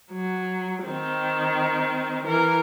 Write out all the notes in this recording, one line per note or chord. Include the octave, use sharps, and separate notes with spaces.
F#3
D#3 C4
E3 A#4